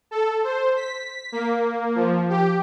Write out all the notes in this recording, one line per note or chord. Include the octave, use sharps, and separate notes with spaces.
A4
C5
B6
A#3
F3
G4